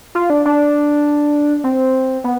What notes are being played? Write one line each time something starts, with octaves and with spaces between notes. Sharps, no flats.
F4
D4
D4
C4
B3